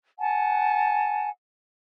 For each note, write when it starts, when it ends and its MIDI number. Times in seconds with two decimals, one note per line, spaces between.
0.18 1.29 78
0.18 1.29 80
0.18 1.29 81